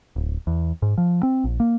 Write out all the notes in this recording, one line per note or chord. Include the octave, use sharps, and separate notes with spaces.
D1
E2
G#2
F3
C4
A#1
A#3